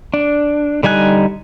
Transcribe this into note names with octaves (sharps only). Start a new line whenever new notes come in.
D4
D3 G3 D#4 G#5 F#6